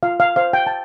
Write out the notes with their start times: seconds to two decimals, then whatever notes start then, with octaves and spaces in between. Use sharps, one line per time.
0.03 F4 F5
0.20 F5
0.36 C5 F5
0.53 G5
0.67 A5